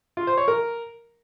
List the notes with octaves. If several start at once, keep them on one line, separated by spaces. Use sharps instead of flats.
F4
C5
C#5
A#4